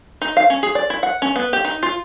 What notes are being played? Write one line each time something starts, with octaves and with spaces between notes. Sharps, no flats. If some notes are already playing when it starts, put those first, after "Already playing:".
D#4
F5
C#4
G#4
D5
E4
F#5
C#4
B3
G4
D#4
F4